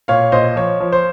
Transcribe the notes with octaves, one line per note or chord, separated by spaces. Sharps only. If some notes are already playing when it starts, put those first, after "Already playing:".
A#2 C#5 F5
A#2 C5 D#5
F3 C#5
F3
C5